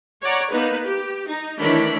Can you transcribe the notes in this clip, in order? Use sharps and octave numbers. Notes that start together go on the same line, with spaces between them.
C#5 D5 F#5 A#5
A#3 B3 D#4 B4
G4
D#4
D#3 E3 A3 D4 C#5 B5